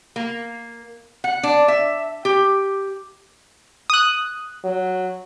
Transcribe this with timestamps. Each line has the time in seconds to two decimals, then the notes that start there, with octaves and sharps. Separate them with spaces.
0.16 A#3
1.24 F#5
1.43 D4
1.68 E5
2.25 G4
3.90 D#6 F#6
4.64 F#3